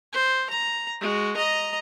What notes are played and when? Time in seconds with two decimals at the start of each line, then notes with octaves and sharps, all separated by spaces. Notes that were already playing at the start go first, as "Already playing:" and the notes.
0.13 C5
0.50 A#5
1.01 G#3 F#4
1.37 D#5 A#5